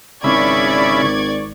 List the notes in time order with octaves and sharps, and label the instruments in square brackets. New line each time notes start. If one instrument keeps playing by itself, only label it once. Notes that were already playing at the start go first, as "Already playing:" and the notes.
[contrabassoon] G#1 [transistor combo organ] C#3 E4 B5 [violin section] D5 C#6 G#6